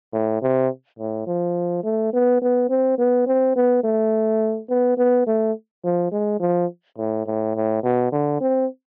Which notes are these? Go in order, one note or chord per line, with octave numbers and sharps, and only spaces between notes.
A2
C3
A2
F3
A3
B3
B3
C4
B3
C4
B3
A3
B3
B3
A3
F3
G#3
F3
A2
A2
A2
B2
D3
C4